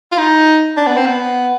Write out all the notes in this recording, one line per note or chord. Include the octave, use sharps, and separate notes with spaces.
F4
D#4
D4
B3
C4
B3